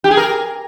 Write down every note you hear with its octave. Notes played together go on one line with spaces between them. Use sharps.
G4
G#4
A#4